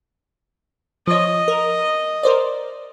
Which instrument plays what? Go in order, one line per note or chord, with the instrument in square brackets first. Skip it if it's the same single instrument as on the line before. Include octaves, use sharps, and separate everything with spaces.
[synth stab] F3 C#5 [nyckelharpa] D#5
[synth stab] A#4
A#4 C5 D5